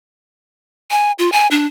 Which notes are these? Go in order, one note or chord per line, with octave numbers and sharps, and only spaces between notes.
G#5
F4
G#5
D4